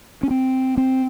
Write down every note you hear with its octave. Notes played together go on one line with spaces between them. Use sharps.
C#4
C4
C4